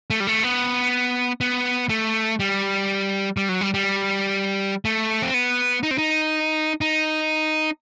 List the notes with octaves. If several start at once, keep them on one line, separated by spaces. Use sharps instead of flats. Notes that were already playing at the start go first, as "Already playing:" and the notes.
A3
G3
A3
B3
B3
A3
G3
G3
F#3
G3
G3
A3
C4
B3
D#4
C4
D#4
D#4